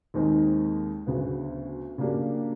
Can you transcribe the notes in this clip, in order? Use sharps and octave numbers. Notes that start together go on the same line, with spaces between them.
D#2 D#3 G#3 C4 D#4
D2 C#3 F#3 B3
C#3 F#3 A#3 D4 G4